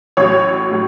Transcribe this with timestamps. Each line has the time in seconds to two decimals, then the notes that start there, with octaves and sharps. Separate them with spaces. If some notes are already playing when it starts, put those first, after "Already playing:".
0.17 A1 A2 F#3 C#5
0.71 A2 F#3